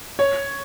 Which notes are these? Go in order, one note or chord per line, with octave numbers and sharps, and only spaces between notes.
C#5